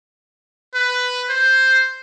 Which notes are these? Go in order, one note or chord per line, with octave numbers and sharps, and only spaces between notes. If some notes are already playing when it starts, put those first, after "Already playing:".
B4
C5